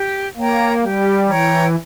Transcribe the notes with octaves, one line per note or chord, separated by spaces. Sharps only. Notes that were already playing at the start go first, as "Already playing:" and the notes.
Already playing: G4
A#3 C#5 G5 A#5
G3 G4
E3 C#5 G5 A#5